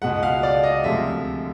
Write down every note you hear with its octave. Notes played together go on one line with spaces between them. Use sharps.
C#2 B2 G#3 F#5
F5
D5
D#5
D2 C3 F3 G#3 E5